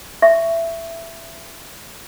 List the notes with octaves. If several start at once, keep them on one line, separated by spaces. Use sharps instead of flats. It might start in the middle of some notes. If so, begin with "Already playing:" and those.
E5 C#6